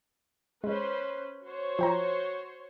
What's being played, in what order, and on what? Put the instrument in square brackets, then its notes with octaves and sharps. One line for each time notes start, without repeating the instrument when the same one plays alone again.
[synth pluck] G#3 [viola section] C#4 B4 C5
[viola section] F#4 C5 C#5
[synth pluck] F3 G5 A#5